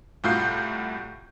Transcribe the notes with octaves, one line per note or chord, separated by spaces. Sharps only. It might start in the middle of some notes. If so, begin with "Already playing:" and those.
C2 A2 F4 F#4 G6 C7